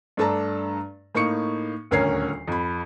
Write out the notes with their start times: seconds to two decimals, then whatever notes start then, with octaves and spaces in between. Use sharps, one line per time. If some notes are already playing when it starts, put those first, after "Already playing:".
0.17 G2 A3 D4 A4 A5 A#5
1.14 A2 A#3 D#4 C#6 C#7
1.91 D#1 D2 C#4 A#4 C#5 C7
2.48 F2 B5